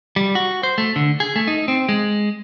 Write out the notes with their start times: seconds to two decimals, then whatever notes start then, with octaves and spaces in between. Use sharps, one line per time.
0.16 G3
0.35 F#4
0.63 C5
0.78 A3
0.96 D3
1.20 G#4
1.36 A3
1.48 D#4
1.68 C4
1.89 G#3